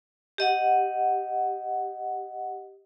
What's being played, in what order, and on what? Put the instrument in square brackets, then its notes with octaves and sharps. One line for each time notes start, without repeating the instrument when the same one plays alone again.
[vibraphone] G4 D#5 F#5